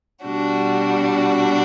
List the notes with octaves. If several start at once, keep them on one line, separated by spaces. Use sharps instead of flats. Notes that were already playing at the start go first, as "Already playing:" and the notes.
B2 G3 D4 F#4